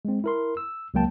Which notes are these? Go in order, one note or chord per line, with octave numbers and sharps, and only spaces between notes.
G#3 C4
E4 A#4 C6
E6
C#2 F#3 A#3 G5 A5